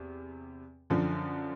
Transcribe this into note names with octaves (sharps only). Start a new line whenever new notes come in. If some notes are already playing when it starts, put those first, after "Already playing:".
Already playing: E2 C3
F#2 D3 F3